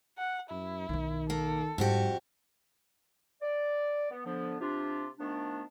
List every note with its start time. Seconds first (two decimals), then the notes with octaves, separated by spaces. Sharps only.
0.18 F#5
0.51 F#2 E4
0.89 B1 D#3 D#4
1.30 A#3 A4
1.78 F2 G#2 G3 F#4 G4
3.42 D5
4.11 B3
4.25 D3 F3 B3 D4
4.60 C3 D4 F4 G4
5.19 D#3 F3 A3 B3 D4